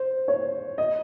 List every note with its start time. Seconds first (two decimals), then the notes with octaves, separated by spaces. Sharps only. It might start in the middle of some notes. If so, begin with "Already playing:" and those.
Already playing: C5
0.28 C#5
0.78 D#5